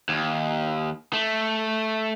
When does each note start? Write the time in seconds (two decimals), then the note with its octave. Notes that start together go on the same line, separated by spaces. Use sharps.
0.09 D#2
1.13 A3